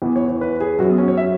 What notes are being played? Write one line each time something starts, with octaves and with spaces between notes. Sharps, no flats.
E2 E3 B3
C#5
C#5
B4
G#4
F#2 F#3 F#4
B3
C#4
C#5
E5